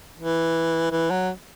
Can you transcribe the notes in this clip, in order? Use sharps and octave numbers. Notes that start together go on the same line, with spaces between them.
E3
E3
F#3